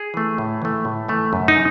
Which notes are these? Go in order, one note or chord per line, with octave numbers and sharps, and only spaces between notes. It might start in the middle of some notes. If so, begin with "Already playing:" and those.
Already playing: G#4
E3 A3
A2
E3 A3
A2
E3 A3
F#2
D#4